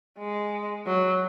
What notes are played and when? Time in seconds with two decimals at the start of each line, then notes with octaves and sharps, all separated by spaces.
0.18 G#3
0.86 F#3